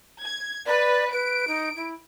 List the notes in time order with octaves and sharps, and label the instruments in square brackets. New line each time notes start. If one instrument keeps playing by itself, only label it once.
[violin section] G#6
[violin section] B4 [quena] D5
[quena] B4 [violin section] D7
[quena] D#4
E4